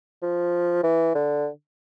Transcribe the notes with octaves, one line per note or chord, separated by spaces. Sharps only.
F3
E3
D3